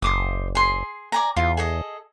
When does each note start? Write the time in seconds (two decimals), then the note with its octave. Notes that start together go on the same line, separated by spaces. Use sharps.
0.02 F#1 C5 D6 D#6
0.55 G#4 C6
1.12 D5 G#5 A#5
1.36 E2 F4
1.57 G#4 A4 D#5